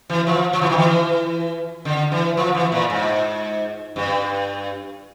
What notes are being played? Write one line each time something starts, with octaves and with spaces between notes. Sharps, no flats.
E3
F3
F3
E3
D#3
E3
D3
E3
F3
E3
A#2
G#2
G2